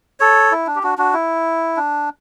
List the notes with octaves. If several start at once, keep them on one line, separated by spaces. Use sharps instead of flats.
A4 C#5
E4
D4
G4
D4 F#4
D4 F#4
E4
D4